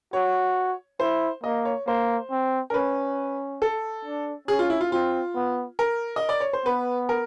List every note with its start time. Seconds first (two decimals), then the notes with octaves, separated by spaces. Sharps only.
0.13 F#4 C#5
1.00 E4 C5
1.44 A#3 D#5
1.65 C#5
1.87 A#3 C5
2.31 C4
2.70 A#4
2.74 C#4 B4
3.62 A4
4.05 D4
4.48 C#4 G#4
4.59 F4
4.70 E4
4.81 F4
4.91 C4 F4
5.35 B3
5.79 A#4
6.16 D#5
6.29 D5
6.40 C#5
6.53 C5
6.65 B3 B4
7.09 A#4